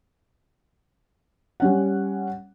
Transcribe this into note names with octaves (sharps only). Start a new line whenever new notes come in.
G3 C#4 F#5